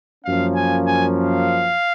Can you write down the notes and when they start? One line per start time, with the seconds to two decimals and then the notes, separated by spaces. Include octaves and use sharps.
0.24 F#2 F3 A#3 C#4 F5
0.55 G#5
0.86 G#5
1.17 F5